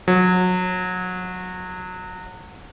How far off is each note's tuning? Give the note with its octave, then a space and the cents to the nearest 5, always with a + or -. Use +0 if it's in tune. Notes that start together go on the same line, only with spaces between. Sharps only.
F#3 -25